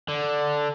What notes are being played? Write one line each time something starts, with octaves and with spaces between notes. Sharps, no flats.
D3